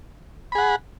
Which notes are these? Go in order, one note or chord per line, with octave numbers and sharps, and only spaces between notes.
G#4 F#5 B5